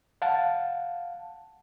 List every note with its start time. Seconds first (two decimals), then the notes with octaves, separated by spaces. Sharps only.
0.22 F5 F#5 A5